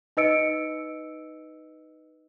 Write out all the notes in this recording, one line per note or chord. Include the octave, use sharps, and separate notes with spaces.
D#4 B4 D#5 E6 C#7 D7